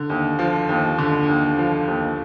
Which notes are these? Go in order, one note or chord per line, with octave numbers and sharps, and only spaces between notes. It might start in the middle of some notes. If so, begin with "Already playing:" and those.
Already playing: D3
D#2
F3
D#2
D3
D#2
F3
D#2